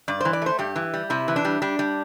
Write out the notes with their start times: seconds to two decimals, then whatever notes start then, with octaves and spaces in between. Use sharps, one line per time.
0.08 G2 D5
0.21 E3 C5
0.33 D5
0.42 A3 C5
0.59 G2 G4
0.76 E3
0.94 G3
1.10 C3 E4
1.28 E3
1.36 D4
1.45 G3
1.62 G3 D4
1.79 G3